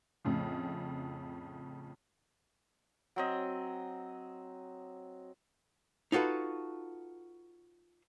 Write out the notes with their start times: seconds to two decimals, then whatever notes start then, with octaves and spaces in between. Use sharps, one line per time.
0.25 F2 A2 C#3
3.16 F#3 C4 D#5
6.12 D#4 F4 F#4 A4 B4